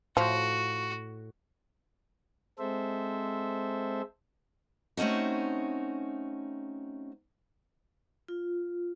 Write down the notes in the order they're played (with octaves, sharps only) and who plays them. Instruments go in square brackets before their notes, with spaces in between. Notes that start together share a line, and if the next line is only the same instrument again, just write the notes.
[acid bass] A2 [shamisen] F3 [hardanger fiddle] F#4
[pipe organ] G#3 C4 A4 C5 E5
[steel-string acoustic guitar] A3 C4 C#4 D#4 F#4
[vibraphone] F4